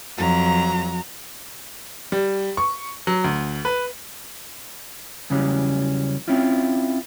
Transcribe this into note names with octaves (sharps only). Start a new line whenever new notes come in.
F2 F#3 A#5
G3
C#6
F#3
D2
B4
E2 C#3 E3 F#3 G3 C#4
C4 C#4 E4 F4